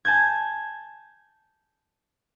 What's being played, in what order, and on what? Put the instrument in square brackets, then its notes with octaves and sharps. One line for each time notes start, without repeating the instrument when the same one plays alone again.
[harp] G#5 A5 G6 G#6